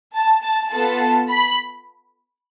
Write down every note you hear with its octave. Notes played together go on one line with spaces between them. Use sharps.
A5
A5
B3 F4 A4 A5
B5